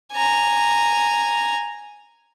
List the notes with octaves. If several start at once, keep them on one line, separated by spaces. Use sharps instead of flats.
G#5 A#5